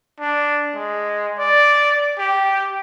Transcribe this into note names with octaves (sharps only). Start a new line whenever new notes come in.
D4
G#3
D5
G4